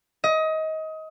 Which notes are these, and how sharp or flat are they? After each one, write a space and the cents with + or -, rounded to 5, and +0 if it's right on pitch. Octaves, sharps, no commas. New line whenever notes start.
D#5 +25